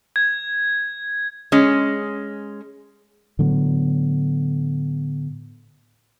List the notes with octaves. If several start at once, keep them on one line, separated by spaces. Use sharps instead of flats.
G#6
G#3 C#4
A2 D3 F#3 B3